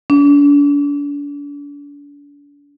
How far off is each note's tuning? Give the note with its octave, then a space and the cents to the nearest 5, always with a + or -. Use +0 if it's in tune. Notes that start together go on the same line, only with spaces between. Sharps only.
D4 -40